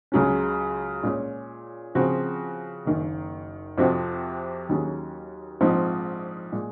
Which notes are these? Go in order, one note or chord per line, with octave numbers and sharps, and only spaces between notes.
C#2 C#3 F#3 C#4
A#2 G#3 C#4 G#4 C#5
C#3 F3 C4 F#4
F#1 F#2 D#3 A#3
F2 C3 F3 C4 F#4
D#2 D#3 F#3 C#4 G#4
A#1 G#2 F3 C4 D#4
A#2 G#3